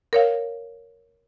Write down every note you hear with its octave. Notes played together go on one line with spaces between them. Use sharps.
A#4 C#5 F5